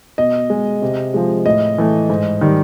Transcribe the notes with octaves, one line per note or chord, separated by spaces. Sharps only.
B2 D#5
G#3
C3
F3 G#3
A2 D#5
E3 A3
G#2
D#3 G3